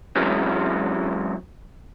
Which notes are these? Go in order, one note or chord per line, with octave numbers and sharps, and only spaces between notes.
E3 F#3 G#3 C4 C#4